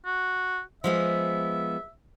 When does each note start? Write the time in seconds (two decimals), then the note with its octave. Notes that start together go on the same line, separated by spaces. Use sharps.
0.05 F#4
0.84 F3 G#3 B3 E5